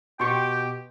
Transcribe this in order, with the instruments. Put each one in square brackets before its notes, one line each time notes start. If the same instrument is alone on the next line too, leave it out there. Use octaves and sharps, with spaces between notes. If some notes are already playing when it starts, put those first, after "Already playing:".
[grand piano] B2 [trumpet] G4 [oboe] G5 [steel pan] C6 C#6